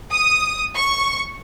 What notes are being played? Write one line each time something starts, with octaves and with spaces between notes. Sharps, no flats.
D#6
C#6